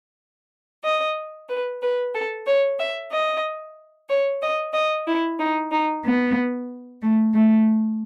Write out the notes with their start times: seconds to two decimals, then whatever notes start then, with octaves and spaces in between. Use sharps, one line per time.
0.84 D#5
1.49 B4
1.82 B4
2.14 A4
2.47 C#5
2.79 E5
3.11 D#5
4.10 C#5
4.42 D#5
4.74 D#5
5.07 E4
5.39 D#4
5.72 D#4
6.05 B3
7.01 A3
7.33 A3